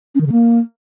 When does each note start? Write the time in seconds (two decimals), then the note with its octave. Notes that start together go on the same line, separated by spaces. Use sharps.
0.15 C#4
0.21 D#3
0.26 C#3
0.32 A#3